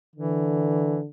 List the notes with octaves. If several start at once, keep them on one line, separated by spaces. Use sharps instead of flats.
D3 E3